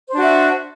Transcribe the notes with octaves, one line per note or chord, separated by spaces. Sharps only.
D4 F#4 C5 E5